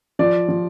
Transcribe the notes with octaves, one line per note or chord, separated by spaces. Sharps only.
F3 D5
F3